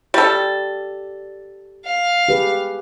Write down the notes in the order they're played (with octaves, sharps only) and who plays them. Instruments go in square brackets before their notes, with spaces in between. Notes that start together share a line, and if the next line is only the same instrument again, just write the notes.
[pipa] G3 A4
[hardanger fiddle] F5
[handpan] G4 G#4 B4